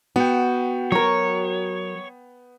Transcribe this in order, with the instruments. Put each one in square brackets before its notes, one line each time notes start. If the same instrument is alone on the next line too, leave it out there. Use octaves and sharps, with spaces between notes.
[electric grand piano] B3 G5 [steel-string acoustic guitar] F#4
[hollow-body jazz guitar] F#3 A#4 [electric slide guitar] C#5